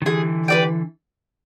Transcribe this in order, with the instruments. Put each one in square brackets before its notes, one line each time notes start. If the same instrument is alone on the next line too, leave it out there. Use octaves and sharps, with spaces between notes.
[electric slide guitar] D#3
[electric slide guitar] D3 E3 [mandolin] G#4
[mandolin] B4 D5 G5